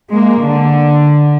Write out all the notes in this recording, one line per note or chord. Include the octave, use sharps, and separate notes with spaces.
G#3 A#3
D3